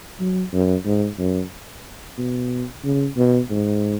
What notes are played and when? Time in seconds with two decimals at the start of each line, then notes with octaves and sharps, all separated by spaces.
0.20 F#3
0.53 F#2
0.85 G#2
1.19 F#2
2.18 B2
2.84 C#3
3.17 B2
3.50 G#2